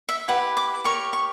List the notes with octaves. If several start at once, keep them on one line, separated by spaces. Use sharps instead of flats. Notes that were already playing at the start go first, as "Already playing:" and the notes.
E5
E4 G4 B4 F#5
D6
G4 A#4 C#5 C#6
C#6